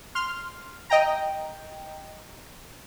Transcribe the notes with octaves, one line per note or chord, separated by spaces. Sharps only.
C6 F6
D#5 G5 A#5